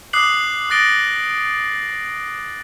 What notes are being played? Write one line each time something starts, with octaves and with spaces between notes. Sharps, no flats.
D6 D#6 F#6 C7 F#7
D#6 F#6 A6 A#6 D7 G7